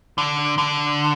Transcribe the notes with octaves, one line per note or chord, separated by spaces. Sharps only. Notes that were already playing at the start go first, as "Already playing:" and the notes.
D3
D3